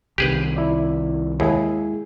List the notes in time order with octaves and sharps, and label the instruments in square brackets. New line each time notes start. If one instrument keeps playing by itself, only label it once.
[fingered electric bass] C2 C3 D#3 [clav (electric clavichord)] G4 G#4 B4
[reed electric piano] E4 D5
[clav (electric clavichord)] D#2 [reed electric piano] G#3 E4 G#4